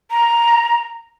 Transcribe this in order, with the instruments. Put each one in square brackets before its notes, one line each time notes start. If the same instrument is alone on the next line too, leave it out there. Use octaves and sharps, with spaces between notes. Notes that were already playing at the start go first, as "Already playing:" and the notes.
[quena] A#5